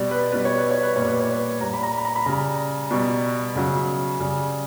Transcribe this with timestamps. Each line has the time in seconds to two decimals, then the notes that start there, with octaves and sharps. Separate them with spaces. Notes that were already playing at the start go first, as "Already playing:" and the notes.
Already playing: B2 G3 D5
0.11 B4
0.32 B2 G3 B4
0.45 C#5
0.58 B4
0.71 C#5
0.83 B4
0.96 A#2 C#5
1.02 G3
1.07 B4
1.21 C#5
1.33 B4
1.61 A#2 G3 A#5
1.74 B5
1.83 A#5
1.98 B5
2.05 A#5
2.16 B5
2.26 C#3 G3 A#5
2.91 B2 G3
3.55 C#3 F#3
4.20 C#3 G3